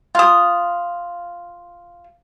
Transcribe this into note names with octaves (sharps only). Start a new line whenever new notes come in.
F4 D#6